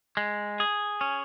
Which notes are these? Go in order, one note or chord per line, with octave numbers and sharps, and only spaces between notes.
G#3
G#4
C#4